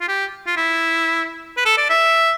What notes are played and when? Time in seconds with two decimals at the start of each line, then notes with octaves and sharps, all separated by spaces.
0.01 F4
0.08 G4
0.47 F4
0.57 E4
1.57 B4
1.66 A4
1.78 D5
1.90 E5